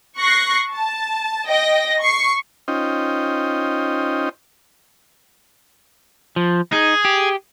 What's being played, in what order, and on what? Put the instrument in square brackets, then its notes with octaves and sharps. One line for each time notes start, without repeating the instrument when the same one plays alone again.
[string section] C#6 F#6 A#6 C7
A5
D#5 G5 A#6
C#6 C7
[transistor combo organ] C#4 D#4 F4 C5 D#5 G5
[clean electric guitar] F3
[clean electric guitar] D#4 [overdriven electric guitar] G#4
[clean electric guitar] G4